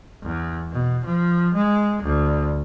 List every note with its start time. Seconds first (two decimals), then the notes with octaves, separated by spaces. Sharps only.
0.23 E2
0.72 B2
1.05 F3
1.54 G#3
2.03 D2